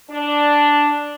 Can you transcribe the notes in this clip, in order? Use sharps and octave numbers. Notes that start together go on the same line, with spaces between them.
D4